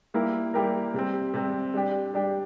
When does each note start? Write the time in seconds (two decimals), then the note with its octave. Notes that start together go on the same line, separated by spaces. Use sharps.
0.14 G3 A#3 E4 G4 A#4
0.54 G3 A#3 E4 G4 A#4
0.94 C3 G3 C4
1.34 C3 G3 C4
1.74 G3 D4 G4
2.14 G3 D4 G4